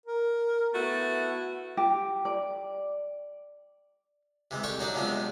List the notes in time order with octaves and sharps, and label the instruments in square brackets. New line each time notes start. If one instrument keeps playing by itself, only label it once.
[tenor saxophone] A#4
[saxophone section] A3 E4 F#4 [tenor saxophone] B3
[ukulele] G4
D5
[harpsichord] C3 E3 G#3
C2 G4 A4 G5 C#6
F#3 D4 D#4 D5
E2 C3 F3 G#3 C4 D4